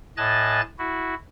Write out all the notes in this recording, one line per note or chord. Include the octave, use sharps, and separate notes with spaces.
A2 D#5 G#5 A5 F#6 A6
E4 F#4